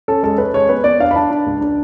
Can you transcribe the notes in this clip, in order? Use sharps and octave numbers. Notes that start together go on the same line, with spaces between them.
C#4 A4
G#3 A4
C#4 B4
G#3 C#5
B3 B4
B3 D5
D4 F5
B5
D4 A5
D4
C#2
D4